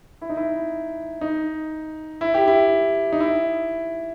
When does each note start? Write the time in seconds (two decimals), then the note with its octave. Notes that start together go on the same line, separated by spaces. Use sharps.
0.22 E4
0.30 D#4
0.37 E4
1.21 D#4
2.21 E4
2.34 G4
2.47 E4
3.12 D#4
3.20 E4